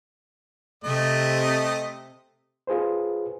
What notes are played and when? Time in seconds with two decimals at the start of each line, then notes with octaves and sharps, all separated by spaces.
0.84 C3 A3 D#5
2.67 F4 G#4 B4 C5